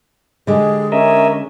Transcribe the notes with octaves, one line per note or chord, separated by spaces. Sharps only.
D3 G#3 G4 G#4
C#4 A#4 D#5 E5